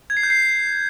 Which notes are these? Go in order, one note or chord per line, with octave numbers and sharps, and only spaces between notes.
G#6
C7
G6
C7